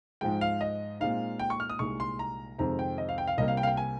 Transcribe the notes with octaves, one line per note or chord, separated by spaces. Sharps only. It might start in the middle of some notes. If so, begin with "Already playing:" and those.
G#2 F3 G#3 G5
F5
D#5
A#2 G#3 C4 D#4 F5
G5
C#6
F6
D#6
C2 A#2 G#3 D#4 C#6
C6
A#5
F2 C3 D#3 G#3 C4 A#5
G5
D#5
F5
G5
F5
C2 C3 G3 A#3 D#5
F5
G5
F5
G5
G#5